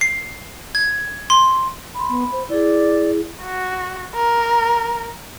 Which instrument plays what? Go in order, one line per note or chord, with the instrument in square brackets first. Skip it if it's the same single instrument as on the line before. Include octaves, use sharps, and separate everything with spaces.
[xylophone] C7
G#6
C6
[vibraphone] B5 C6
[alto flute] B3 [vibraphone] B5
[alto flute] C5
[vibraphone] E4 G#4 [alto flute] D5
[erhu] F#4
A#4